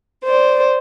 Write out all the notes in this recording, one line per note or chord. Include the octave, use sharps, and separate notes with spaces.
C5 D5